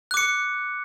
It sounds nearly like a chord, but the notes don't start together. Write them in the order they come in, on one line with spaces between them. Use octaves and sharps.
F#6 D6 C#7